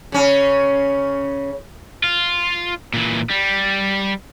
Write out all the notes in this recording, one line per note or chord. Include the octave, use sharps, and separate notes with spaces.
C#3 C#4
F4
A#2 E3
G3